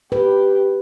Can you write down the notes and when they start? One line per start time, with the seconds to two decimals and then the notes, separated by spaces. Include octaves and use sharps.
0.12 G4 B4